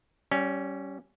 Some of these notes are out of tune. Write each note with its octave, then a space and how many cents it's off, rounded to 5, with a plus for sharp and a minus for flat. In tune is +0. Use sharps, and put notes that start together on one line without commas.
G3 -20 C#4 +0